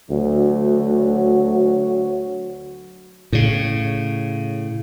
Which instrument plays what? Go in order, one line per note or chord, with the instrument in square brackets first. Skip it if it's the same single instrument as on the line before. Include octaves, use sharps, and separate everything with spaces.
[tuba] D2 [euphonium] F#3
[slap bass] A2 C#3